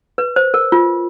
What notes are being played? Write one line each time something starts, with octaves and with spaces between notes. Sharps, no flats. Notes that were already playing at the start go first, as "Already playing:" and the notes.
B4
C5
A#4
F4